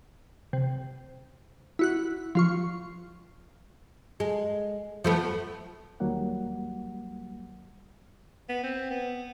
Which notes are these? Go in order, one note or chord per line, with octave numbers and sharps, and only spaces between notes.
C3
E4 F#4 F#6
F3 F4 C#6
G#3
F3 A3 B3
D#2 F#3 G3 A#3 F#5
B3
C4
B3